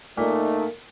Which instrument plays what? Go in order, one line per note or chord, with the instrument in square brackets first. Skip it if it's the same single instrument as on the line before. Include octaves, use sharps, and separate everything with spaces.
[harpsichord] A#2 [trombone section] A3 D#4